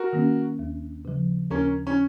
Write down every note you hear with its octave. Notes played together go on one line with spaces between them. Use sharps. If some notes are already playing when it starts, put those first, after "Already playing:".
Already playing: F#4 A#4
D#3 A#3 C#4
D#2
C#3 F3
D#2 A#3 C#4
C#4